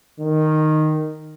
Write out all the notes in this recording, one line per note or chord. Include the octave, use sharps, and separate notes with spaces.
D#3